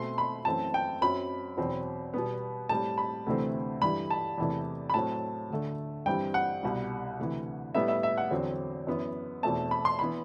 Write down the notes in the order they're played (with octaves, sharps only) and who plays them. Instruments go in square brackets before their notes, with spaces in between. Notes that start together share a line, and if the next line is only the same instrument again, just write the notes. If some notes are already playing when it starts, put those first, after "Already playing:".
Already playing: [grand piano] B2 A3 C4 C6
B5
F#2 E3 A3 C4 A5
G5
F#2 F#3 C4 B5
E2 B2 F#3 C4
B2 G3 B3
A2 G3 C4 A5
B5
D2 C3 E3 A3 C4
G2 E3 G3 B5
A5
E2 C3 E3 A3
B5
A2 F#3 C4 A5
D2 D3 A3
G2 E3 G3 C4 G5
F#5
C2 B2 G3
D2 C3 E3
A2 G3 B3 E5
E5
E5
F#5
E2 D3 F#3 C4
F#2 E3 B3
E2 B2 A3 C4 A5
B5
C6
E3 B3 B5